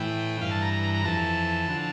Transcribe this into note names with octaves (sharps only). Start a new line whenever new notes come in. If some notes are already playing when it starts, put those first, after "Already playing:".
Already playing: A2 E3 G5
G2 E3 F5
A5
A#5
A#5
A#5
A#5
F2 E3 A5
D3 F3